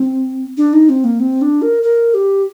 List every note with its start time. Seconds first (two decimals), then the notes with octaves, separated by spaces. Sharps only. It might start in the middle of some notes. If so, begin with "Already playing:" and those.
Already playing: C4
0.57 D4
0.73 D#4
0.89 C4
1.04 A#3
1.20 C4
1.42 D4
1.62 A#4
1.83 A#4
2.14 G4